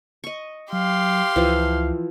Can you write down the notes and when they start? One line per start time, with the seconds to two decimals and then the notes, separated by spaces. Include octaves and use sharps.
0.24 D#5 C#6
0.73 F#3 G4 F5 C6
1.36 C#2 E3 F3